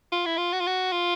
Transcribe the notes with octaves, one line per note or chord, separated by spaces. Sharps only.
F4
E4
F4
F#4
F4
F#4
F4